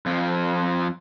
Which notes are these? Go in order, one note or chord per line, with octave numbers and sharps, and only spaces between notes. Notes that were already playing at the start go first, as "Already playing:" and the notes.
F2 F3